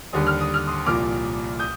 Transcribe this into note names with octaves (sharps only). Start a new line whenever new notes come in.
D#2 D3 G3 D#6
F6
D#6
F6
C6 D#6
C2 A#2 F3 D6 F6
D#6 G6